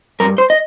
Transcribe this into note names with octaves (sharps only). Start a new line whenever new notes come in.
G2 A#4
C5
D#5